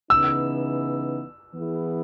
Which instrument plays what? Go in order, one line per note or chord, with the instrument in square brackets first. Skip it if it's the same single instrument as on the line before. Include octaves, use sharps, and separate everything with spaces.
[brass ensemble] C#3 E3 B3 D#4 [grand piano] E6
[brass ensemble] E3 B3 E4 G#4